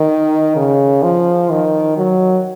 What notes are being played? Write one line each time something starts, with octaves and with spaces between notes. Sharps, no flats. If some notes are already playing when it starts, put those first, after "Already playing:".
Already playing: D#3
C#3
F3
D#3
F#3